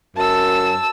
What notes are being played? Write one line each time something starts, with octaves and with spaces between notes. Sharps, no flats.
F#2 A5 E6